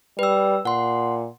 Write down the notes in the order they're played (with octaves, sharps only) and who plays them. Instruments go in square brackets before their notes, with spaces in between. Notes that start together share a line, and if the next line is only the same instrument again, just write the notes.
[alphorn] G3 [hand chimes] B4 E6
[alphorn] A#2 [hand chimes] F#5 C6